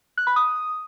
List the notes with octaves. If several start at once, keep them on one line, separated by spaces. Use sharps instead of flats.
F#6
B5
D#6